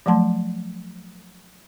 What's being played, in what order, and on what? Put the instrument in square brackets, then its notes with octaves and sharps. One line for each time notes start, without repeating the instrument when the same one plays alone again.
[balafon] F3 F#3 A3 A5 C6